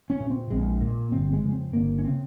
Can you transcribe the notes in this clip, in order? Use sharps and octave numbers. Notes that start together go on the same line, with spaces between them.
C#4
A#2
C4
A#1 G#3
A#2 A#3
G1 C4
G#3
F2 C#3
C4
G1 A#3
C#4
C#3 C4